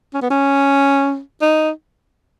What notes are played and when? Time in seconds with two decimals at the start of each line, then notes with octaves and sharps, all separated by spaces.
0.14 C#4
0.22 B3
0.30 C#4
1.41 D#4